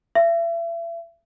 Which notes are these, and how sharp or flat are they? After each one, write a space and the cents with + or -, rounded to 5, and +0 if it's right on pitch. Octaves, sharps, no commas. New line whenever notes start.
E5 +35